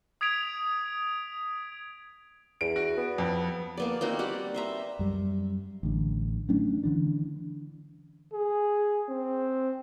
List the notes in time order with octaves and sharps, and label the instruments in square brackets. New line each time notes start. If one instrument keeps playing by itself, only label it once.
[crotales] D#6 G#6 B6 D7 F7
[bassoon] E2 [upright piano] D7
[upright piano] F#4
[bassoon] B3
[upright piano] F2
[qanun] A#3 B3 D5
A#3 C4 D#4 F#4
G3 D5 F#5
C5 E5 A#5
[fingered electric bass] F#2 G3
A1 D3
F#3 A3 C#4 D4
D3 E3 D4
[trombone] G#4
C4